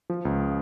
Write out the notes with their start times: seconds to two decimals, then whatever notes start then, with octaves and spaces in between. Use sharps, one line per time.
0.10 F3
0.25 C#2